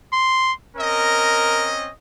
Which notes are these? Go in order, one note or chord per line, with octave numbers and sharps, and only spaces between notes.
C6
C4 C#4 A#4 D#5